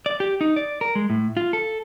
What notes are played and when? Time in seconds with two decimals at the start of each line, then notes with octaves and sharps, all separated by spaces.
0.06 D5
0.20 G4
0.41 D#4
0.56 D5
0.81 A#4
0.95 G#3
1.10 A2
1.37 F4
1.53 A4